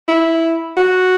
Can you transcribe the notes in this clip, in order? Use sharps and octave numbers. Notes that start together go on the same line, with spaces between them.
E4
F#4